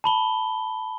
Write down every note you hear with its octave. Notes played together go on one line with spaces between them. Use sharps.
A5 B5 G7